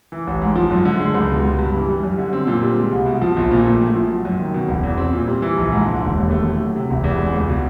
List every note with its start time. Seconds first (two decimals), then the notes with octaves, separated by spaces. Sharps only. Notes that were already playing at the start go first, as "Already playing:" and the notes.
0.12 E3
0.27 A1
0.42 G#2
0.56 F3
0.71 F#2
0.85 D3
1.00 G#3
1.15 C#2
1.30 B2
1.45 G3
1.59 G2
1.74 E3
1.89 G3
2.03 F#2
2.19 D3
2.33 C4
2.47 A#2
2.63 G3
2.77 G#3
2.91 C2
3.06 B2
3.21 F3
3.37 A#1
3.51 A#2
3.65 A3
3.80 A2
3.96 F3
4.10 F#3
4.25 F#2
4.39 D#3
4.54 B2
4.68 E1
4.83 E2
4.98 C4
5.13 A#2
5.27 G3
5.42 E3
5.57 A#1
5.72 G#2
5.87 D3
6.01 E1
6.16 D#2
6.31 A3
6.46 A2
6.60 F#3
6.76 C3
6.90 E1
7.04 E2
7.19 G#3
7.33 C#2
7.49 B2